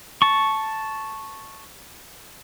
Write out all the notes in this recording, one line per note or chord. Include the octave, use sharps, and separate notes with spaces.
A5 C#6